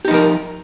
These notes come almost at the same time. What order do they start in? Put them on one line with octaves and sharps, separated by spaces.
G4 D#4 F3 A#4